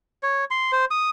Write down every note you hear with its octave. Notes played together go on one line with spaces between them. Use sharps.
C#5
C6
C5
D#6